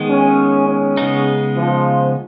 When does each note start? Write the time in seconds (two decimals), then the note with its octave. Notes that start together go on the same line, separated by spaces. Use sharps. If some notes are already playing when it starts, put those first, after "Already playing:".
Already playing: D#3 G#3 B3
0.09 C#4
0.68 C#4
0.97 C#3 G#3 B3 D#4
1.57 F3